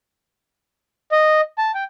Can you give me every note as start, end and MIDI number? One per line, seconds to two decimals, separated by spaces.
1.12 1.41 75
1.58 1.71 81
1.75 1.84 79